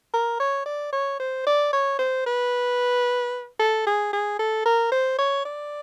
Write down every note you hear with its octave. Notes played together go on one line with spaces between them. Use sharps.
A#4
C#5
D5
C#5
C5
D5
C#5
C5
B4
A4
G#4
G#4
A4
A#4
C5
C#5
D5